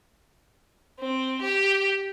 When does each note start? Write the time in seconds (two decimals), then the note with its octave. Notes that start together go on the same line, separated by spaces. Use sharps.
1.00 C4
1.42 G4